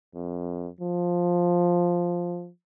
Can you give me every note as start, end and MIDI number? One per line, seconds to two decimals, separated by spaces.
0.15 0.68 41
0.80 2.50 53